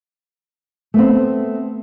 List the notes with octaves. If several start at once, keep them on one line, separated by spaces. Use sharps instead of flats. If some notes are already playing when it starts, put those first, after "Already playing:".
A3 B3 C4